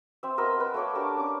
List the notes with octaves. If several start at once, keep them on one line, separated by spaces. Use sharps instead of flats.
C4 E5
B3 A#4 D#5 E6
B4
A3 A4 C#5 D6
D4 G4 A#4 A5
C#4 D6